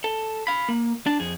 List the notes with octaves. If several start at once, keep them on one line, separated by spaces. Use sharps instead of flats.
A4
F5 B5
A#3
D4 A5
F2 G#4